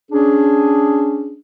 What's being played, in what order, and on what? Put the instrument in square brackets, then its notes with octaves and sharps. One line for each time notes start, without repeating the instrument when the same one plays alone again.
[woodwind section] C#4 D4 G#4